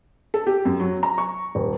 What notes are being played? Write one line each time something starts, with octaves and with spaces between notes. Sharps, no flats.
A4
G4
F#2
F#3
A#5
C#6
D#1